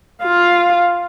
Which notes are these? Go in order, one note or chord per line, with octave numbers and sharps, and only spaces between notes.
F4 F5